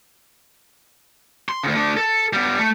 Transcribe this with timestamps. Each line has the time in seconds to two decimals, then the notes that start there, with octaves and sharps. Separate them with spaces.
1.49 C6
1.63 D2 C#3
1.75 A3 D4
1.97 A4
2.33 G3 B3
2.59 A3